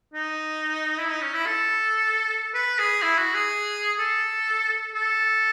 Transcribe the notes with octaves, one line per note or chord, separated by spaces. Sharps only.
D#4
E4
D#4
C#4
E4
A4
B4
G#4
E4
F#4
G#4
A4
A4